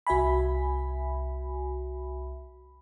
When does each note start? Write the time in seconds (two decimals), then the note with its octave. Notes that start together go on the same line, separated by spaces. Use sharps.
0.07 C2 F#4 E5 G#5 B5